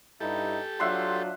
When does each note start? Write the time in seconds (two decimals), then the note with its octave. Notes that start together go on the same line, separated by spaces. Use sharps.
0.21 G2 D#4 E4 G4 A4
0.80 F#3 D4 F4 E5 F#5 C6